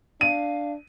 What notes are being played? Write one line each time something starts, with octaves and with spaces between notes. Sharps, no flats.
D4 F5 D#7